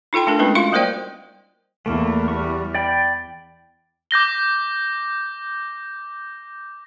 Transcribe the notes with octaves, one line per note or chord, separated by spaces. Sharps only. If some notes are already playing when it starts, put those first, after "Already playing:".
D#4 F4 A4 G5 C6
A3 D4 A4 A#4
G#3 B3 C#4 D#4 E4 B4
F4 F#4 F5 C6
G3 A#3 A#4 C5 D5 G5
E2 A3 A#3
G3 C#6
D5 G5 B5
D6 G6 A#6 G7